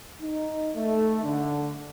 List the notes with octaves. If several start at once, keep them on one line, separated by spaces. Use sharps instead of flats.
D#4
A3
D3